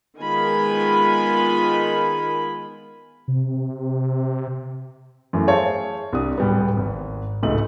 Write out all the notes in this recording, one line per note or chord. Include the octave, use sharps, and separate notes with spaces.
D#3 G#3 B3 F4 G#5 B5
C3
F#2 E3 A3
G#4 C5 C#5 E5 F5 A5
C2 D4 D#6
D1 G3 B3
G#1
D1 C#2 A3 D#4 F#7